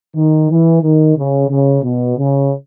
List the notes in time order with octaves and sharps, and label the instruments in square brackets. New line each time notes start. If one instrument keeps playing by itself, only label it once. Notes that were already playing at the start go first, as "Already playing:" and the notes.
[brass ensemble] D#3
E3
D#3
C#3
C#3
B2
C#3